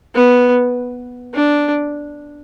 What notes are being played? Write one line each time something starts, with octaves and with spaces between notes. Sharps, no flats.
B3
D4